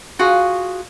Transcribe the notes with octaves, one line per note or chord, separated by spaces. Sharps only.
F4 F#4 G#4 F5